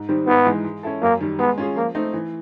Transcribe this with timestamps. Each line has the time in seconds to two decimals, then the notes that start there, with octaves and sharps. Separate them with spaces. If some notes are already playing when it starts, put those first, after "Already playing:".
Already playing: G#2
0.09 D#3 G3 C4 D#4
0.27 G#2 B3
0.46 E3 G#3
0.65 G#3
0.83 C#4 E4 A4
1.02 F#2 A#3
1.20 D#3 G3
1.39 G#3 B3
1.58 C#4 F4 G#4
1.76 F3 A#3
1.95 A3 C4 D#4
2.14 E3